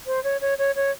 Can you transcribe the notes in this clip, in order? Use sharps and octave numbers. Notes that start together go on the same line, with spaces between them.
C5
C#5
C#5
C#5
C#5